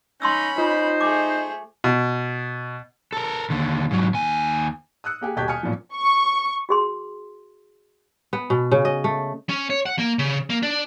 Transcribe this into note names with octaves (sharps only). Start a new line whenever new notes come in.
C#4 D#4 B5 C6 D#6 E6
D#4 F4 C5
A3 G#4 D6
B2
A4 A#4
D#2 D3
G#2 F#3
D#2 G#5
D#6 E6 F#6 C#7
A#3 G4 G#4
D#1 B2 G4 G6 G#6 B6
G#5 D#6 F6 C#7
F#2 A#2 F3
C#6
F#4 G#4 C6
B3
B2
C#3
D#5
A3
C#4
C#5
F#5
A#3
C#3
A#3
D4